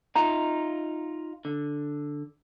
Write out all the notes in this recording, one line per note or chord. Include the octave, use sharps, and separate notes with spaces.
D#4 F4 A#5
D3